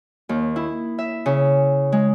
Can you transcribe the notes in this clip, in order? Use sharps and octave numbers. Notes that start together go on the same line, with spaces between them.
D#2
E4
E5
C#3
G#3